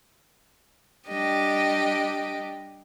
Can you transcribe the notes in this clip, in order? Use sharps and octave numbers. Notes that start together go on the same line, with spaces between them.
G3 D4 G4 D#5